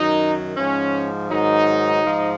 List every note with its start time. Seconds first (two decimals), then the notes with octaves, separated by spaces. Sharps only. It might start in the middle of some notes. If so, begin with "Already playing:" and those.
Already playing: F#2 D#3 F#3 D#4
0.57 G#2 F3 C#4
1.29 G#2 D#3 F#3 D#4
2.03 G#2 F3